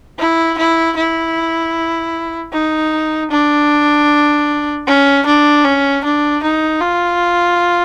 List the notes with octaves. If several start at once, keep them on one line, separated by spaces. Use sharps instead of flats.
E4
E4
E4
D#4
D4
C#4
D4
C#4
D4
D#4
F4